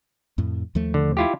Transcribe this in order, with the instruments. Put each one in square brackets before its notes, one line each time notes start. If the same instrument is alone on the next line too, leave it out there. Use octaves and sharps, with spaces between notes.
[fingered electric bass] F2 A2
D#2 F3 A3
[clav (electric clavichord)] D3
E4 F4 G4